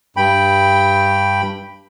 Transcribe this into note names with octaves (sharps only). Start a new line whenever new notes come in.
G2 G5 B5